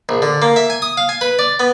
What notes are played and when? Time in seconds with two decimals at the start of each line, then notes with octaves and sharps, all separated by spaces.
0.09 A#1
0.22 D3
0.42 A#3
0.56 E5
0.70 G#5
0.82 D#6
0.97 F5
1.09 G#5
1.21 B4
1.39 D5
1.60 B3